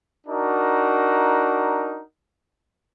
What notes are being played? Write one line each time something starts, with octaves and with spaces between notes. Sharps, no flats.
D4 D#4 F#4 A#4